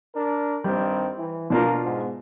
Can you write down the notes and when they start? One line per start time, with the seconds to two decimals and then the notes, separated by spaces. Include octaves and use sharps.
0.15 D4 A#4
0.64 G2 D#3 G3 C4
1.16 E3
1.50 B2 A#3 D4 F4 A#4
1.82 G#2